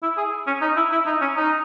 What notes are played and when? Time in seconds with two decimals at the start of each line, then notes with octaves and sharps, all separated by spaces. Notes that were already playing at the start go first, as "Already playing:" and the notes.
0.03 E4
0.17 G#4
0.47 C#4
0.61 D#4
0.76 E4
0.92 E4
1.06 D#4
1.21 C#4
1.36 D#4